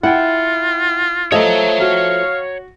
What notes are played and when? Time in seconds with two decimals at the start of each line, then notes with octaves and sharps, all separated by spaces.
0.03 E4 F4 F#5 G5
1.32 F3 A3 A4 C#5 D#5 A#5
1.81 F#4 F5